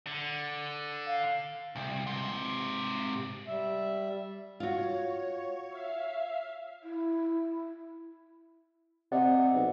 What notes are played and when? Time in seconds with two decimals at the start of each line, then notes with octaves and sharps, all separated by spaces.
0.07 D3
1.07 F5
1.76 C2
2.07 G#2 C3
3.48 G3 E5
4.60 F4 F#4 C#5
5.69 E5 F5
6.83 E4
9.12 C3 D5 D#5 F#5
9.55 B1